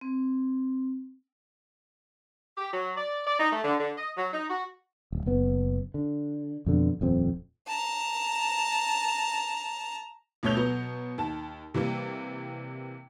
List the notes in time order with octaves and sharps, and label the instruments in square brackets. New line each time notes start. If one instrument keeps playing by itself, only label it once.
[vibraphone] C4
[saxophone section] G4
F#3
D5
D5
D#4
A3
D3
D3
D#5
F#3
D#4
F#4
[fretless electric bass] D1
F#1 B3
D3
F2 B2 D3
D#1 F2 C4
[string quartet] A5 A#5
[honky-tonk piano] D2 B2 A3 C#5 G6 F7
B2 F#3 B3
D#2 A5
C3 E3 G3 A#3